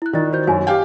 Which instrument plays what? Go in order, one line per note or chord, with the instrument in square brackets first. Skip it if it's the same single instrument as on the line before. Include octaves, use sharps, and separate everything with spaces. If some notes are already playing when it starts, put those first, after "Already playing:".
[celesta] E4 F#6
[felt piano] D#3 [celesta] F4 D5 A6
[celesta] F#4 C5 G6
[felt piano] F#2 [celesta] G#5
[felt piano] G4 F5 G5